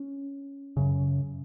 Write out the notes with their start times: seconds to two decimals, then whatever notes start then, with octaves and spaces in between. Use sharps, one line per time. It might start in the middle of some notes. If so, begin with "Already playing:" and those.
Already playing: C#4
0.77 F#2 C#3